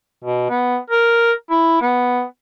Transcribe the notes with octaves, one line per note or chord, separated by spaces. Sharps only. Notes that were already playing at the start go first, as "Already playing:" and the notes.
B2
B3
A#4
E4
B3